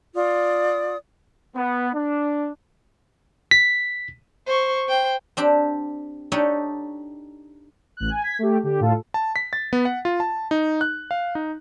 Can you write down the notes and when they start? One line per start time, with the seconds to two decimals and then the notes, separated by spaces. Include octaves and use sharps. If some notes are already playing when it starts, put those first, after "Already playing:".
0.15 F4 D5 D#6
1.56 B3
1.95 D4
3.51 B6
4.47 C5 C#6
4.88 C5 G5
5.37 C4 D4 G4
6.32 D4 D#4 G4 A4 C#5
7.97 A1 F#6
8.10 G#5
8.23 G#6 B6
8.39 A3 G4
8.63 D3 G4
8.80 A2 F4 A4
9.14 A5
9.36 B6
9.53 A6
9.73 B3
9.85 F#5
10.05 F4
10.20 A5
10.51 D#4
10.81 F#6
11.11 F5
11.35 D#4